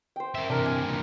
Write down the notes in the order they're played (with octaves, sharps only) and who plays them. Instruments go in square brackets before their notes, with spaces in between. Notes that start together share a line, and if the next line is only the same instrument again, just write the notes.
[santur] C5 G5
[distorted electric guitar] A#4 E5
[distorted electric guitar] C3 E3 [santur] D4 A#4
[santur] G#5
[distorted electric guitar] G2 A#2